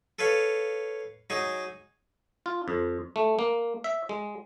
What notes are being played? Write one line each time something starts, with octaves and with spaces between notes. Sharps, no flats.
A4 B4 C#5 F5
F#3 D#4 G#4
F4
F2
A3
A#3
E5
G#3